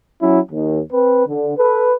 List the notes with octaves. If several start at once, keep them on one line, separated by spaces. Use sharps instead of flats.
F#3 C#4 E4
D#2
C4 B4
D3
A4 B4